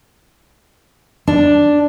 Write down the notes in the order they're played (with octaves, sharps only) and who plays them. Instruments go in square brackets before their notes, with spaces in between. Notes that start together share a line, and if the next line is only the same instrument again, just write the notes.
[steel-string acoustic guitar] D4